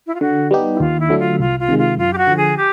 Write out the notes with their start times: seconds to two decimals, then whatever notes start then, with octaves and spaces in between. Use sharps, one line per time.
0.06 E4
0.14 F4
0.21 D3 F#4
0.51 G3 B3 D#4 G4
0.74 E4
0.80 D#2 F4
1.00 E4
1.09 D3 F#3 A3 D4
1.19 F4
1.40 C2 F4
1.59 F4
1.68 C3 D#3 G#3
1.78 F4
1.98 F#2 F4
2.13 G4
2.17 F#4
2.27 D3 F3
2.37 G#4
2.57 G4